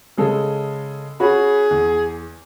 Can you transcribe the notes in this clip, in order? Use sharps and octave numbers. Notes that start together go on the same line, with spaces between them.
C#3 G#3 A4
C#4 F#4 G#4 B5
E2